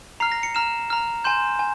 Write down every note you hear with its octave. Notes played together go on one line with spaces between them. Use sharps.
A#5 F6 C7
A#6
C#7
A#5 F6 E7
A#5 F6
G#5 C6 G6 E7
G#5